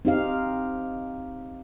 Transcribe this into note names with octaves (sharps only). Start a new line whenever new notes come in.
C4 D#4 G4 F5